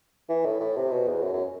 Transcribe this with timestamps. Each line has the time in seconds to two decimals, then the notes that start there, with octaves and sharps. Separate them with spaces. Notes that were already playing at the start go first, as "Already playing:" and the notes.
0.29 E3
0.46 A2
0.60 A2
0.77 C3
0.91 B2
1.07 E2
1.23 F#2
1.33 F#2